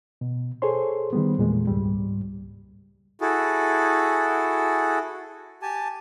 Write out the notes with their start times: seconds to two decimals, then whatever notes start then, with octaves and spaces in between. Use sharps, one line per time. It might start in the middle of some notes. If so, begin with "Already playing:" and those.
0.21 B2
0.62 G#4 A4 C5 C#5 C6
1.13 D#3 G3 B3
1.38 E2 A#2 G#3
1.68 C#2 G#2 G3
3.21 E4 F#4 G#4 A4
5.62 G4 G#5 A5